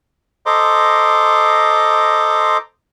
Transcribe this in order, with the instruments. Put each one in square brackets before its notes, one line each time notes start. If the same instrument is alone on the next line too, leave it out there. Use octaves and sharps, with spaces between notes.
[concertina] A4 C5 D#5 A#5 C6 D6